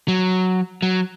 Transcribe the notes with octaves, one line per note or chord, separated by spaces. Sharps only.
F#3
F#3